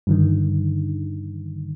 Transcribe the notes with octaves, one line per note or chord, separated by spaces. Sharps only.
G2 D3 D#3